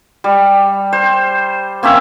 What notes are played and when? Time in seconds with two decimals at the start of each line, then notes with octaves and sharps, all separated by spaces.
0.24 G3
0.93 C5
1.83 A#3 C4 C#4 E5